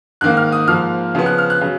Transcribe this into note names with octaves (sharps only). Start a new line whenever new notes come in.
G#2 D#3 A#3 F#6
F6
D#6
G#2 F3 A#3 F6
C#3 F3 B3
F#6
F6
F#6
C#3 F#3